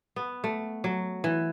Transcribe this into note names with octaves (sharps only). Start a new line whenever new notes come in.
B3
A3
F#3
E3